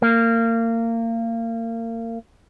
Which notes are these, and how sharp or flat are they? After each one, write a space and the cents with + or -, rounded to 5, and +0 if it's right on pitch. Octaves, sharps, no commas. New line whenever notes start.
A#3 -30